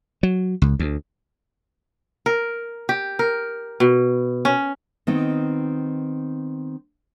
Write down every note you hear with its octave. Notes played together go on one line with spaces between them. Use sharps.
F#3
C#2
D2
A#4
G4
A#4
B2
C#4
D#3 B3 C4 D#4